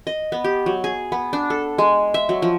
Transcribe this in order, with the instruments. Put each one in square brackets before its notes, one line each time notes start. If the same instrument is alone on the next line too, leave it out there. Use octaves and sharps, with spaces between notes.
[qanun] D#5
B3
G4
F#3
G#4
B3
D4
A4
G#3
E5
F#3
F3